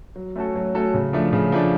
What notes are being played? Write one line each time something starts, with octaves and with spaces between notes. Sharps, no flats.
F#3
A3 C#4 F#4 A4
F#3
A3 C#4 F#4 A4
C#3
F3 A3 D4
C#3
F3 A3 D4